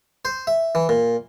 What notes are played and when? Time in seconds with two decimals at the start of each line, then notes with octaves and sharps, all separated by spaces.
0.25 C5
0.47 E5
0.75 E3
0.89 A#2